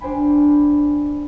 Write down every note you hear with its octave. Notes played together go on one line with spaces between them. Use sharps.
D4 C5 G5 G#5 B5